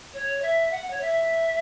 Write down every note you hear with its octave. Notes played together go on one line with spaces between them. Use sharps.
C#5
E5
F#5
C#5
E5